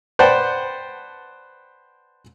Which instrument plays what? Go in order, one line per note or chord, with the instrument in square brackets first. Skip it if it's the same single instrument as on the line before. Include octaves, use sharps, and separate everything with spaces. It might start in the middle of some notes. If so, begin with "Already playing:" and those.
[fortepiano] B4 C5 D5 F#5 G5 A5